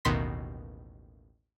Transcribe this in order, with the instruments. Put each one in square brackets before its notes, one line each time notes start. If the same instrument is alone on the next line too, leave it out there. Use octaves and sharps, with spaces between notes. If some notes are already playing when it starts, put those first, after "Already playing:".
[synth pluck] A1 D#2 B2 D#3 C6 B6